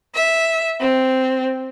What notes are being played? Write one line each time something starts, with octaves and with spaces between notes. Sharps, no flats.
E5
C4